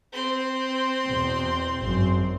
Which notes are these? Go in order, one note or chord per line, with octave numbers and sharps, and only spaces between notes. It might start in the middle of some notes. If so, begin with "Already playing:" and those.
C4 C6
E2 B2
G#1 F#2